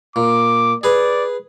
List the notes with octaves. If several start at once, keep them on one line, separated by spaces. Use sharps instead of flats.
A#2 D6
G#4 B4 D5